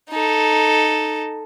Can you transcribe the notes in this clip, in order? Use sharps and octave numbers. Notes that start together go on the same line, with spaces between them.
D#4 A4